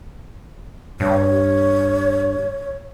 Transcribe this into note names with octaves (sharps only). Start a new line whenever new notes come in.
G2 C#5